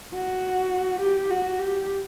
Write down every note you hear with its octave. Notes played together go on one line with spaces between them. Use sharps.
F#4
G4
F#4
G4